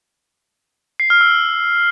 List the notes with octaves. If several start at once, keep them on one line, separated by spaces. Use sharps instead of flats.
C7
F6
E6